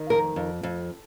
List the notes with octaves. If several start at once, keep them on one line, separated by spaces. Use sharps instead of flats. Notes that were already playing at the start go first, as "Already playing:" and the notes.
Already playing: D#3
F2 A#4
F2
F2